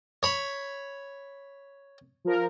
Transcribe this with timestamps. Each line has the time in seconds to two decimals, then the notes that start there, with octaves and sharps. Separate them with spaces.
0.23 C#5 B5
2.25 F3 A#4